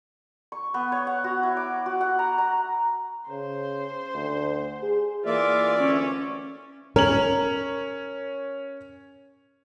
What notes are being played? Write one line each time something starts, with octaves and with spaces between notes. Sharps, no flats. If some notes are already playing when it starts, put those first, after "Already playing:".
C#6
B3
C#5
F#5
F#4
E4
D6
F#4
F#5
A#5
A#5
C#3 C5
D2
G#4
E3 A#3 F4 D5 E5 D6
D2 C#4
C#4 A#4 F#7